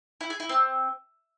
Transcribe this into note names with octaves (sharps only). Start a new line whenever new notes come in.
E4
G#4
E4
C4